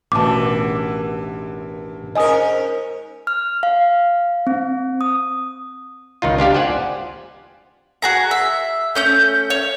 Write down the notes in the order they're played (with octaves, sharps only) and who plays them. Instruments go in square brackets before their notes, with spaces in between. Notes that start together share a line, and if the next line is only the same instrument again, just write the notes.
[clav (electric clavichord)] A1 B2 [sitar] D#2 D3 E3 [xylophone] A5 D6
[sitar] G#2 C#4 A#4 [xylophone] D#5 G#5 D#6
[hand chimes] F6
F5
C4
D#6
[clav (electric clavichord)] C#2 D#3 D#4 F4
D4 F4 G4 F5
C5 D5 F#5 G#5
[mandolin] F#4 G#4 A#5
E5
A3 C#4 G6
C#5